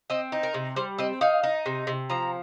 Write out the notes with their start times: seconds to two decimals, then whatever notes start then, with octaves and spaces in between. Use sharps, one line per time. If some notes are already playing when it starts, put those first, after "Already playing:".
0.10 C4 D#5
0.32 D#4
0.43 A#4
0.54 C3
0.76 G3 C5
0.98 C4 D#5
1.21 D#4 F5
1.43 D#4
1.66 C3
1.87 C3
2.10 F3 A#5